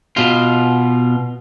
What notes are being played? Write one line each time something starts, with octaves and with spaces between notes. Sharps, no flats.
B2 F4